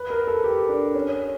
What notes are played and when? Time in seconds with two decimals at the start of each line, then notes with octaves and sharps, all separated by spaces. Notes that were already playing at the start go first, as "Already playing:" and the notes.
Already playing: B4
0.10 A#4
0.27 A4
0.44 G4
0.69 D4
0.94 C#4